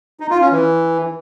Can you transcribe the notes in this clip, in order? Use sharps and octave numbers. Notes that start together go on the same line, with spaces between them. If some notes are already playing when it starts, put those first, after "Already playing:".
D#4
F4
C#4
E3